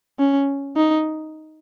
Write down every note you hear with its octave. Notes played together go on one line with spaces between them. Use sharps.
C#4
D#4